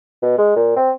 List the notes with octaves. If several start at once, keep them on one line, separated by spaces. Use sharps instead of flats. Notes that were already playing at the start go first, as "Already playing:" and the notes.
B2
G#3
A#2
C4